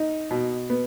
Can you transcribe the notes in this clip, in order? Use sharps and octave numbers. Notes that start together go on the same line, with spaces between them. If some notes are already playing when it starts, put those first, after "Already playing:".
Already playing: D#4
B2
B3